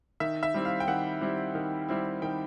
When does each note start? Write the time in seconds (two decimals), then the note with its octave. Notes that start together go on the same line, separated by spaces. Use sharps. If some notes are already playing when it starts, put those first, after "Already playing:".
0.20 D#3 E5
0.43 E5
0.54 G3 C4 E4
0.65 F5
0.80 G5
0.87 D#3 F#5
1.21 G3 C4 E4
1.55 D#3
1.88 G3 C4 E4
2.22 D#3 G5